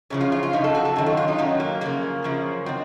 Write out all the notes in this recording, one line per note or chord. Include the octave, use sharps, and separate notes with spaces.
F#2 C#3 F3 C#4
F4
F4
F4
F#2 C#3 F3 D#4
A4
F#4
A4
F#2 D#3 F#3 F#4
F4
F4
D#4
F#2 D#3 F#3 C#4
A#3
F#2 C#3 F3 A#3
F#2 C#3 F3
D#3 F#3 C4